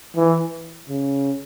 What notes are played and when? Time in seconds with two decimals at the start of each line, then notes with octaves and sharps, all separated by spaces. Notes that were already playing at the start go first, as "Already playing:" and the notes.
0.16 E3
0.89 C#3